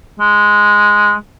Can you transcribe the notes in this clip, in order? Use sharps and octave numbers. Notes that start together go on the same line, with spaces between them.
G#3